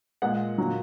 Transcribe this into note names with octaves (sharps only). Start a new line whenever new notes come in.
A#2 G#3 F#5
A#2 F#3